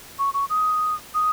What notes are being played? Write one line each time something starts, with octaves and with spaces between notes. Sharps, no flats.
C#6
C#6
D#6
D#6